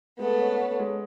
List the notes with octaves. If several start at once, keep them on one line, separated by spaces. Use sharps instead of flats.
G#3 A3 B3
C#4
C#4
G#3